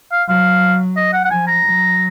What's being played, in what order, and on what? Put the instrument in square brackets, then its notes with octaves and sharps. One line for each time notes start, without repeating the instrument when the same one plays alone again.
[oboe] F5
[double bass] F#3 [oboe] F5
[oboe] D#5
F#5
F#5
[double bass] F3 [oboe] G#5
[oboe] A#5
[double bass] F#3